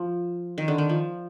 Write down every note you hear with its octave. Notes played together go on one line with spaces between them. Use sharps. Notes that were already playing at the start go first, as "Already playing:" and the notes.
Already playing: F3
D#3
D3
D#3
F3